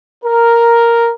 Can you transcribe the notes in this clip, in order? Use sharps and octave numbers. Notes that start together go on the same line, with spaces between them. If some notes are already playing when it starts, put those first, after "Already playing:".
A#4